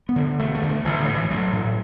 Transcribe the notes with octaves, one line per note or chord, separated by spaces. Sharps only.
B3
D2 D3
E1 A3
A3
D2 D3
A3
A1 E3
D3
A2
E3
A1 F#3
A2